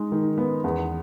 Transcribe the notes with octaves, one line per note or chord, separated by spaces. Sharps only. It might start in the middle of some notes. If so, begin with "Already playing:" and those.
Already playing: G#3 D#4
D#3
B3
E2